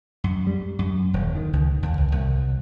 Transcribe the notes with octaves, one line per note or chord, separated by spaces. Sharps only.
F#2
G3
F#2
D#1
D#3
C#2
D#2
C#2
C2